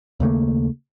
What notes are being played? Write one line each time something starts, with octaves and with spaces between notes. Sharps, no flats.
D#2 C#3 A3 A#3